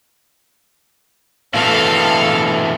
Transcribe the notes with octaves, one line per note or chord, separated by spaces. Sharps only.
B2 E3 A3 A4 F5